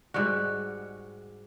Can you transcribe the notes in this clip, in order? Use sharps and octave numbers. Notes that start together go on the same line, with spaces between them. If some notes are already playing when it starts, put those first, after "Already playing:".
G#2 G3 G#3 F#4